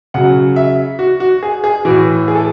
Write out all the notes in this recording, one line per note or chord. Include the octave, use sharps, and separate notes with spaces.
C#3 F#3 F#5
E5
F#4
F#4
G#4
G#4
A2 E3 F#4
G#4
A4